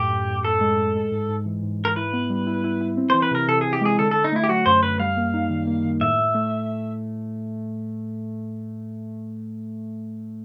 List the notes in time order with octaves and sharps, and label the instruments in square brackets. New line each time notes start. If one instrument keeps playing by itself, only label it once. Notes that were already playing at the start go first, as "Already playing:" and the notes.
Already playing: [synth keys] F#2 A2 [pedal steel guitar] G4
[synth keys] A2
A2
[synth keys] A2 [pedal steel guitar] A4
[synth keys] G#3
A2
G#3
G#2
G#2
E3
G#2
G#2
[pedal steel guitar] A#4
[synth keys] E4 [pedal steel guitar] B4
[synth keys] B3
G3
E4
E4
E4
C4
[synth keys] E3 [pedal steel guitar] C5
[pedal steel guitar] B4
[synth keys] C3 [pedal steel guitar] A#4
[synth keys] C3 [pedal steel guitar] A4
[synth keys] C3 [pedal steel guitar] G#4
[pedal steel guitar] G4
[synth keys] G#3 [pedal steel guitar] G#4
[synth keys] D3 [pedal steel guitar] A4
[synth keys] D3 [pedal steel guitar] A4
[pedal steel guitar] D#4
[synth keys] A3 [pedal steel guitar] E4
[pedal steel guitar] G4
[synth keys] F#3 [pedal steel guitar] F#4
[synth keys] F#2 [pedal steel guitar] C5
[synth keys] F#2 [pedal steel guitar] B4
[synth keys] G3 [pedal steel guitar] F5
[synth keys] A#3
D#4
D#3
A#3
D#3
[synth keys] A2 [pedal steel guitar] E5
[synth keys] A2
A3